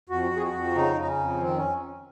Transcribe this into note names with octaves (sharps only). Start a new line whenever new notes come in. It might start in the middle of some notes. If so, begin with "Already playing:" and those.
F2 F#4
F2
G#4
F#4
F2
C#3 D#4
C#3 D#4
C#4
F2
D#3 C4
C#4